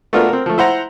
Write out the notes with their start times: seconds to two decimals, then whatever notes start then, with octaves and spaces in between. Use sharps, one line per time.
0.13 A3 B3 D4 F4 F#4 A#4
0.29 C4 A#4
0.46 F3 A3
0.58 E4 C5 F#5 A#5